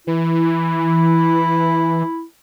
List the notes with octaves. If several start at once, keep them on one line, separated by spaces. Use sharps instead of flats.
E3 E4